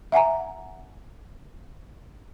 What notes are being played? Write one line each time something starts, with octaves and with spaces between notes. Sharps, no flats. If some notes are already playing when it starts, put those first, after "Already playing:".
E5 F#5 G#5 A#5